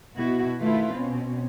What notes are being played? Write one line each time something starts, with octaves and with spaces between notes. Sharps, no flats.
B2 B3 E4 F#4
D#3 A3 E4 F4 B4
B2 C4 C#4